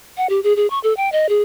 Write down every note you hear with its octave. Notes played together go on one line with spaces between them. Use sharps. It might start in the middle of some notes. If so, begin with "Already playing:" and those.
F#5
G4
G#4
G#4
C#6
A4
G5
D#5
G#4